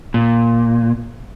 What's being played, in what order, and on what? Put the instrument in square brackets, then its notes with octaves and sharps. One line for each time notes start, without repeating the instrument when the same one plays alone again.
[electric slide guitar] A#2